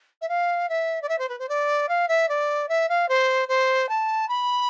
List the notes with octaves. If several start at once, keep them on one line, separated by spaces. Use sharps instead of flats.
E5
F5
E5
D5
E5
C5
B4
C5
D5
F5
E5
D5
E5
F5
C5
C5
A5
B5